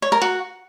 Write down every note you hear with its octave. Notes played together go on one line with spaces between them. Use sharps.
C#5
A#4
F#4